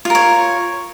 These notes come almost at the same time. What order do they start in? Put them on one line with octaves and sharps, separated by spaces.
F4 A#4 C#5